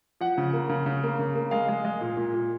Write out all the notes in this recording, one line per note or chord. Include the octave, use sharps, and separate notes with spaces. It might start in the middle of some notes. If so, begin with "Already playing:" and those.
F3 F#5
C#3
A#3
C#3
C#3
A#3
C#3
A#3
G#3 F5
G#3
G#3
A#2
A#2
A#2